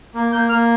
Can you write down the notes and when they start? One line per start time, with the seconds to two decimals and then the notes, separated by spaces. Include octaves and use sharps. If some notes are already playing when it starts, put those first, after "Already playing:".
0.15 A#3
0.32 A#3 G6
0.49 A#3 F6